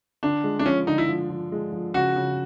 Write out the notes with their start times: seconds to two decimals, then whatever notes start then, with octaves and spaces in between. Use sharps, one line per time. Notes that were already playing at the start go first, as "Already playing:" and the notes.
0.23 D3 D4
0.44 G#3
0.59 D4
0.65 F3 C#4
0.87 D3 D#4
0.98 E4
1.08 F3
1.30 F3
1.52 G#3
1.72 F3
1.94 C#3 F#4
2.16 C#3